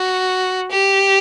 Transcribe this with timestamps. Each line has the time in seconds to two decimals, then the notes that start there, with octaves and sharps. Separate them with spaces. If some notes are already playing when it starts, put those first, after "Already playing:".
Already playing: F#4
0.72 G4